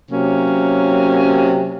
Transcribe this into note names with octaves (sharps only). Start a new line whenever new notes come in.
C3 F#3 A#3 C#4